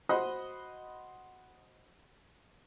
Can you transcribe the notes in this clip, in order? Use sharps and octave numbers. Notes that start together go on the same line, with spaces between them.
F#4 C5 D#5 F#5 B5 D#6